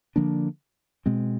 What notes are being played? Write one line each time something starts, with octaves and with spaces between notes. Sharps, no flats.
D3 F3 A#3 D4
B2 G#3 C4